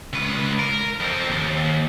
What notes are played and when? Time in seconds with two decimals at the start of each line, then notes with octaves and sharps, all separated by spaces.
0.13 C#2 B4
0.59 A#4
1.00 F2 C4
1.30 D#2